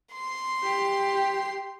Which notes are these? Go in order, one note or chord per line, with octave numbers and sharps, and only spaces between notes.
C6
G4